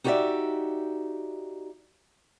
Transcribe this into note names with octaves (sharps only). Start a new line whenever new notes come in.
D#4 F#4 G4 C5 D5 E5